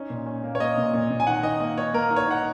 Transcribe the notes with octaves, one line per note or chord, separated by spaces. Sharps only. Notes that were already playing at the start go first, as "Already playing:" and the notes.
Already playing: C#4 D#4
A#2
C#4
A#3
C#5
A#3 D#5
A#2
A#2
A#2
G#5
D#3 F#5
D#4 D#5
A#3 D#5
D#4 C#5
A#3 A#4
D#4
C#5
D#4 F#5